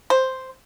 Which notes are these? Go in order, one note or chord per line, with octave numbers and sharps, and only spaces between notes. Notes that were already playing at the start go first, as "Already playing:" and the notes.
C5